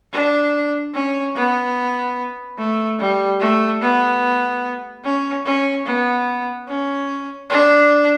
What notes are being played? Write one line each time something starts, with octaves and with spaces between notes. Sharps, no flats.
D4
C#4
B3
A3
G3
A3
B3
C#4
C#4
B3
C#4
D4